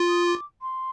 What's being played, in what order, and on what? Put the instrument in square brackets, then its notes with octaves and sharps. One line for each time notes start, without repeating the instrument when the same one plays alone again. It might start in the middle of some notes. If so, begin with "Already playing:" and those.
Already playing: [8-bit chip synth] F4
[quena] D#6
D6
C6